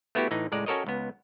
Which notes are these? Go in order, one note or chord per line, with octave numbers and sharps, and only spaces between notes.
A3 B3 E4 F#4 G4
A2 E3 D#4
C#2 A2 G#3 D5 A#5
C#4 F#4 A4 A#4 C#5 D#5
C#2 B3